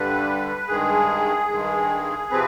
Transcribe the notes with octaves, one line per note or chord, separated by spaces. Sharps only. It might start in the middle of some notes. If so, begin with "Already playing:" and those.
Already playing: G2 D3 G3 B4
G2 D#3 G#3 G#4
G2 D#3 G#3
C3 F3 C4 B4